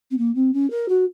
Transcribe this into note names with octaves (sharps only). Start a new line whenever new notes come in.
C4
A#3
C4
C#4
A#4
F#4